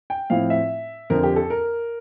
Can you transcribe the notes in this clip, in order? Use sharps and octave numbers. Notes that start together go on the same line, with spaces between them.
G5
A2 F3 C4 E4 F5
E5
F2 D3 F3 A#4
G4
A4
A#4